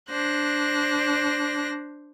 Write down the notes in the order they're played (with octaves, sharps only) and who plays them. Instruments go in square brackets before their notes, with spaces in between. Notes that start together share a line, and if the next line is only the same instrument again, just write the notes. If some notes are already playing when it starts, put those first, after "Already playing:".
[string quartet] D4 C5 F#6 A#6